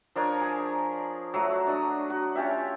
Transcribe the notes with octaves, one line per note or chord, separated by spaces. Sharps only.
F3 D4 A#4 C#5
G#4
F#3 A3 F#4
D4 D#5
F#4
C#4 F4 G4 E5